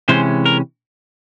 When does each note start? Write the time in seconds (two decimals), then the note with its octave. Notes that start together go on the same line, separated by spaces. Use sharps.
0.09 C3 E3 G#3 C#4 C5
0.46 A#4